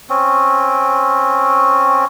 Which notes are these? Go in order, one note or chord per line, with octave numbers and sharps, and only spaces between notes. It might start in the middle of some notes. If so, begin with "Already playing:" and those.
C4 C#4